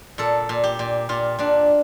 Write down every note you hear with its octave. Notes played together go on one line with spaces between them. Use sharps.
A#2 A4
A#2
G4
A#2
A#2 F4
A#2 D4